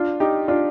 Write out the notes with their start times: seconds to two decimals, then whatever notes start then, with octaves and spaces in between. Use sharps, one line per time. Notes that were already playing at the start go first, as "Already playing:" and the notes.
Already playing: D4 F4
0.20 D#4 G4
0.48 D4 F4